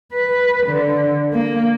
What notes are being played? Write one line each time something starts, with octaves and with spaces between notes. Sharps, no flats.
B4
D3
A#3